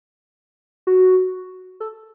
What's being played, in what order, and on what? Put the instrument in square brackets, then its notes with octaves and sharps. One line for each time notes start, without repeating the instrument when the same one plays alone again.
[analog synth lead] F#4
A4